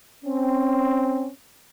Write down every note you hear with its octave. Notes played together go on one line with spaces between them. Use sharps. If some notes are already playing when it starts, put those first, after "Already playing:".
C4 C#4